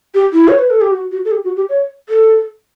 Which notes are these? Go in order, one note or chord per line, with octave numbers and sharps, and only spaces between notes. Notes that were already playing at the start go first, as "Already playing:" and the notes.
G4
E4
C#5
B4
A4
G4
F#4
F#4
A4
G4
F#4
G4
C#5
A4